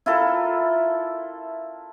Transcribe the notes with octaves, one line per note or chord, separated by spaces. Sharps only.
E4 F4 A4 A#4